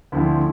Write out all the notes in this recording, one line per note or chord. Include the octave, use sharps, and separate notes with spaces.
D2 D3 F3 C4 E4